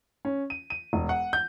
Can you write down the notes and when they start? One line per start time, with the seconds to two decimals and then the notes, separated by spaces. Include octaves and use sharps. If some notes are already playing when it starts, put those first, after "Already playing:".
0.25 C#4
0.50 D#7
0.70 D#7
0.93 E1
1.09 F#5
1.33 G6